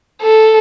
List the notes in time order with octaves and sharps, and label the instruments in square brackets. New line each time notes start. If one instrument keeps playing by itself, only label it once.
[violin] A4